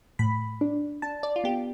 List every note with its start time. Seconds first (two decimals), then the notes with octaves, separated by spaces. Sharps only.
0.19 A2 B5
0.61 D4
1.02 D4 A5
1.23 D5
1.36 F4
1.44 B3 G4